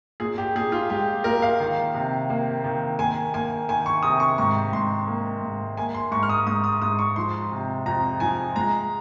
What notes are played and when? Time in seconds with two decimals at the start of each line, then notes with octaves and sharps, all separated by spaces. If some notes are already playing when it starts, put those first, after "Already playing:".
0.20 A#2 G#4
0.38 G4
0.55 A#2 G#4
0.72 F4
0.90 G#3 G4
1.24 A#2 A#4
1.42 F5
1.60 D#3
1.94 C3
2.30 A#3
2.64 D#3
2.99 A#3 G#5
3.34 A#3 G#5
3.69 D#3 G#5
3.86 C#6
4.03 C3 D#6
4.20 C#6
4.38 G#2 C#6
4.73 G#2 C6
5.07 A#3
5.42 G#2
5.77 A#3 G#5
5.95 C6
6.12 G#2 C#6
6.23 F6
6.29 D#6
6.46 G#2 D#6
6.64 D#6
6.82 G#2 D#6
6.99 C#6
7.16 F3 C6
7.52 C3
7.86 F2 A#5
8.20 F3 G#5
8.56 G#3 A#5